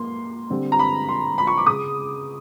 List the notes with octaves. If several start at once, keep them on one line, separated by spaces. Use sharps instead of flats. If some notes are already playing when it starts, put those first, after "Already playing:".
Already playing: A#3 C6
D3 G3 C4
A#5
B5
C6
B5
C#6
D6
C#3 D#6